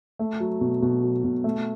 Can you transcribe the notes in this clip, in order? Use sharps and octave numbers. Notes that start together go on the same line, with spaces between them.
A3
F#3
B2
B2
F#3
B2
A3